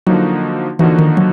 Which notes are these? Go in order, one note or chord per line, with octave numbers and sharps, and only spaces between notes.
D3 F3 F#3 A#3 D#4 F#4
D3 E3 F3 A#3 D#4 F#4
D#3
F#3